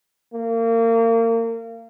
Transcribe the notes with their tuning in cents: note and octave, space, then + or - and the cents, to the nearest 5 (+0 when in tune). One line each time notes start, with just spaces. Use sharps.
A#3 -30